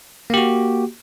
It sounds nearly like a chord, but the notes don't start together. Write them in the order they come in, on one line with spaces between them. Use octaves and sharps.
A#3 G4 F#4